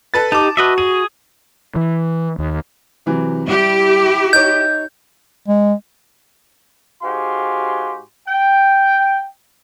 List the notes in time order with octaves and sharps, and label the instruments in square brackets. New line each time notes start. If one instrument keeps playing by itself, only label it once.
[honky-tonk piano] A4 B4 A6
[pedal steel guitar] D#4 [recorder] G4 [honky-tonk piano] A5 D6
[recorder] F#4 [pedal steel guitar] B4 D#5 E5
[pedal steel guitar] G#4 [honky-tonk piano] D#7
[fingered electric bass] E3
D#2
[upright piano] C3 E3 F#3
[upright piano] G3 [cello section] E4 G4
[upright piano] D#4 C#5 [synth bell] G6
[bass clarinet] G#3
[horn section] G#2 F#4 G4 F5 G#5 C6
G5